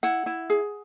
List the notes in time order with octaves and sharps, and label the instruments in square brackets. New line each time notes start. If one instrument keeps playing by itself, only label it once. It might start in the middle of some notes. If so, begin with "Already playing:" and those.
[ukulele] E4 F#5
E4
G#4